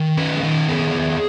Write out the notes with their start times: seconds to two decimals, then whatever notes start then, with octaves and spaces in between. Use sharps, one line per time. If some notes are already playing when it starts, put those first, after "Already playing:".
Already playing: D#3
0.17 C#4 B4
0.36 G#4
0.43 D#3 A#4
0.68 B3 G#4
0.94 D#3